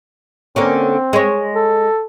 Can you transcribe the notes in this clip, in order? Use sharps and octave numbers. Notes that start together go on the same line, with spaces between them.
D3 A#3 C4 C#4
G#3 C#5
A4